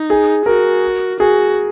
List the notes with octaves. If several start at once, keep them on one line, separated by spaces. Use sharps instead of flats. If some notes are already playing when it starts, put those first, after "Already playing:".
Already playing: D#4
G#4
F#4 A#4
F#4 G#4